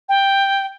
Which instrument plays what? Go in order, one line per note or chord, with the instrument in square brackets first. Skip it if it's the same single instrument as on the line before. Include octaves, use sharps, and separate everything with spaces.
[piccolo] G5